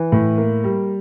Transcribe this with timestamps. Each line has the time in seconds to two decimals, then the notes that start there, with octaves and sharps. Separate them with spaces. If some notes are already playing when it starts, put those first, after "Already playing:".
Already playing: E3
0.12 A2
0.38 A#3
0.64 G3